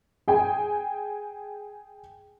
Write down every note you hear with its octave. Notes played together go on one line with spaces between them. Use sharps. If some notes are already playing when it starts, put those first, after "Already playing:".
G#4 G5 G#5